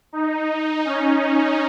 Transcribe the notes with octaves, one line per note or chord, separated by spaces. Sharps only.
D#4
C#4